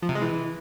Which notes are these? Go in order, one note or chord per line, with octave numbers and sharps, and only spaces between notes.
F3
C3
G#3
E3